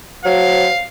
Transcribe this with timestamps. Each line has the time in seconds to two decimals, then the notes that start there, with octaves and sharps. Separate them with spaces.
0.25 F#3 C5 F5